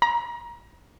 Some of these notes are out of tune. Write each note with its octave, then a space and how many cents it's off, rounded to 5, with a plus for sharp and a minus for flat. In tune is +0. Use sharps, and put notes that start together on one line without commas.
A#5 +30